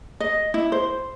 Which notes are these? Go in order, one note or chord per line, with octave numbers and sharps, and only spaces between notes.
D#5
E4
C5